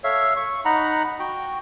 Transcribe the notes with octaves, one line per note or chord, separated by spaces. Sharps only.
A4 C#5 E5 F5
C#6
D#4 F#5 A#5 B5
F#4 G5